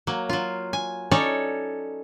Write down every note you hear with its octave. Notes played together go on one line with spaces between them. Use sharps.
F#3 A#3
F#3 F4
G#5
C#4 D#4 A4 C#5 D5